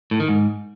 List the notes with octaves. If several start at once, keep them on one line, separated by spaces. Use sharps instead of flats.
A2
D#3
G#2